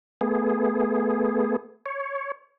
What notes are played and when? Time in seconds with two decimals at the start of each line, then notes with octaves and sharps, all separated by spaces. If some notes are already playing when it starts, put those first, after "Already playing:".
0.21 A3 B3 G#4
1.86 C#5